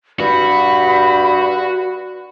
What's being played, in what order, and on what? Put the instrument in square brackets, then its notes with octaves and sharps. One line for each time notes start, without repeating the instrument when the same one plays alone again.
[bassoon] G2 [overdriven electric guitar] F#4 [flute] B5